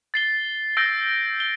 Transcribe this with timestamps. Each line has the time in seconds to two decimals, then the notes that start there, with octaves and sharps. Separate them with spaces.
0.14 A6 C7 G7
0.77 E6 G6 A#6 D7 G7
1.40 G7